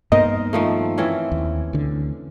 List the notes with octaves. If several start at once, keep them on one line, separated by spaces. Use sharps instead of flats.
G2 A#3 B3 D#4 A#4 C5 D#5
D#3 F3 A3
E3 C4 C#4
D#2
D2 D3